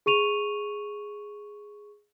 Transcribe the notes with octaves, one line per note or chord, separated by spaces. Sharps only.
G#4 C#6 D#7 F7